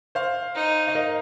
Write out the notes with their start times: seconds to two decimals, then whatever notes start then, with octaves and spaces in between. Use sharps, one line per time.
0.15 C5 F5
0.55 D#4
0.87 F5
0.95 A#4 D#5